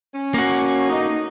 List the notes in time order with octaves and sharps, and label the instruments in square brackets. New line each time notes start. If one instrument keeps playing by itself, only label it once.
[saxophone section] C#4
[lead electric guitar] A#3 F#4
[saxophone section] A3 D#4